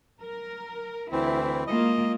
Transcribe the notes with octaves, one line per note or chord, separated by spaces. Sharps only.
A#4
D2 E3 C4 E4
G#3 A#3 F4 D#5